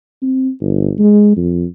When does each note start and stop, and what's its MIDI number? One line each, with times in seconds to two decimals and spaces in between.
0.22 0.50 60
0.61 0.93 31
0.98 1.32 56
1.37 1.65 41